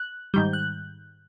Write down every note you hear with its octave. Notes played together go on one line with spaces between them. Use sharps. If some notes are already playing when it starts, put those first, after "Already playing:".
Already playing: F#6
G#2 D#3 G3 G6
F#6